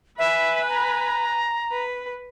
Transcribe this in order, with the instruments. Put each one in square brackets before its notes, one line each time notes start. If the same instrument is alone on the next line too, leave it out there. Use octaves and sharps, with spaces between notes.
[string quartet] B4 G#5 B5 [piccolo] E5
[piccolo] A#5
[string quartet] B4